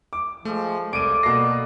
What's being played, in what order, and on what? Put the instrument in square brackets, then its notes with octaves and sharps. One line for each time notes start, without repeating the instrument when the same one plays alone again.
[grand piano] D6
[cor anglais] F3 [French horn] G#3 [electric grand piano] A3
[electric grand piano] C2 [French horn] A4 [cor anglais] D5 [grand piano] D7 D#7
[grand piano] B2 C7 [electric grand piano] A#3 A#6